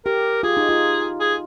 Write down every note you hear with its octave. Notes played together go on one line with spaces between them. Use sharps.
G4 A#4
F4 G#4
D#4
F4
G#4